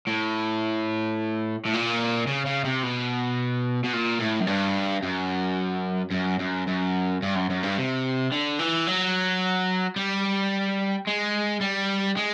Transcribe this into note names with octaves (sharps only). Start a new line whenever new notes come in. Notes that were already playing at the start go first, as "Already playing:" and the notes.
A2
A2
A#2
C#3
C#3
C3
B2
B2
A#2
A2
F#2
G2
F#2
F#2
F#2
F#2
G2
F#2
F#2
G2
C3
D3
E3
F#3
G3
G#3
G3
G#3